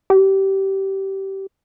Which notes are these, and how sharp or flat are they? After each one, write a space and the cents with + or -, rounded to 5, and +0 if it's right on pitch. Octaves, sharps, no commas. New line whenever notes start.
G4 -20